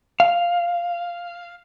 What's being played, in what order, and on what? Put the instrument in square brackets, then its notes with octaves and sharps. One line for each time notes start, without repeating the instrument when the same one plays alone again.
[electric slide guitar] F5